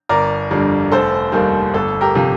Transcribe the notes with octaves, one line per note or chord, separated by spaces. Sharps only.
G1 A#4 D5
F2 D3 G3
F1 A4 C5
D#2 D#3 G3
G1 A4
G4 A#4
C3 F3